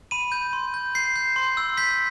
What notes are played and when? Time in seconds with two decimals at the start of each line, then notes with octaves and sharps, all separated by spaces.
0.11 B5 D#7
0.32 G6
0.53 C6
0.74 G6
0.95 G6 C7
1.16 G6
1.36 C6
1.57 E6
1.77 G6 B6